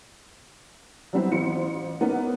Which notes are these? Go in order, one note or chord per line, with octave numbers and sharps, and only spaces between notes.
F#3 G3 B3 C4 E4
A1 F4 C5 C#7
A#3 B3 C#4 D#4 A#4